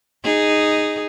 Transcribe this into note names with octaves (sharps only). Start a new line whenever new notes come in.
D#4 G#4